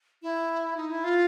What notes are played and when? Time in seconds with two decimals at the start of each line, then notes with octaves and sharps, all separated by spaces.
0.22 E4
0.77 D#4
0.90 E4
1.04 F4